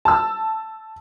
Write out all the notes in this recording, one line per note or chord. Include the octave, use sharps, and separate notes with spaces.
A5 E6